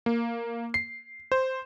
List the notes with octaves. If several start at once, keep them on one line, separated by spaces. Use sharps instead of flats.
A#3
C7
C5